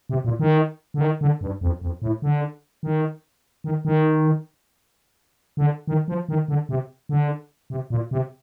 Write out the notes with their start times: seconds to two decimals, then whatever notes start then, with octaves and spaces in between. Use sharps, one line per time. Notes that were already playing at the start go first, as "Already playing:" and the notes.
0.09 C3
0.25 A#2
0.39 D#3
0.94 D3
1.01 D#3
1.21 D3
1.41 G2
1.61 F2
1.81 F2
2.02 A2
2.22 D3
2.83 D#3
3.64 D#3
3.85 D#3
5.57 D3
5.87 D#3
6.08 F3
6.29 D#3
6.48 D3
6.69 C3
7.09 D3
7.70 C3
7.90 A#2
8.11 C3